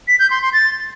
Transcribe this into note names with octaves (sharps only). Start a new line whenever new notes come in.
B6
G6
C6
C6
A6